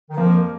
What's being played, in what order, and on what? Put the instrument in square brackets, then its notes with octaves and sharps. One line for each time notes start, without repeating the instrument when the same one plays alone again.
[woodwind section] D#3
[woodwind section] F2 F3 [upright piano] A#3